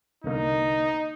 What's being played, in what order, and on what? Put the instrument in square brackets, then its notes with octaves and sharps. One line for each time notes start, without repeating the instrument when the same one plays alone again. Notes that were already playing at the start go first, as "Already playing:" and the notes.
[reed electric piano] C2 D3 A#3 [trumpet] D#4